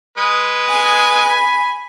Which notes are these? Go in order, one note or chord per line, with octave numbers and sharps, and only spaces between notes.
G#3 B4 D#6
G#5
B5